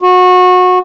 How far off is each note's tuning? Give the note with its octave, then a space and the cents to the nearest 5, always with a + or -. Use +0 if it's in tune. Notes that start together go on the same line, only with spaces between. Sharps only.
F#4 -25